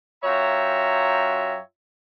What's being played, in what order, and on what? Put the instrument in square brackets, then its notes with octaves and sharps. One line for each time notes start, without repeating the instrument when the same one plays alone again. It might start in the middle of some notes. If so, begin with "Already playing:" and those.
[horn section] F#2 F4 C#5 E5 G5 A#5